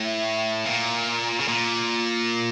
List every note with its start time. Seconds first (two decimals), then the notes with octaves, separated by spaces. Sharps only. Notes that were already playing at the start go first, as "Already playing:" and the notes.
Already playing: A2
0.65 A#2
1.40 C#3
1.48 A#2